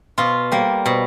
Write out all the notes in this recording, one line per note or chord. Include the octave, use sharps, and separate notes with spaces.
B2 F4
G3 A#3
B2